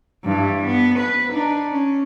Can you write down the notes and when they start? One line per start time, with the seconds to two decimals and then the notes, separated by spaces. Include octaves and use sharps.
0.25 G2 E3
0.66 B3
0.99 B4
1.33 D4 D#4
1.72 C#4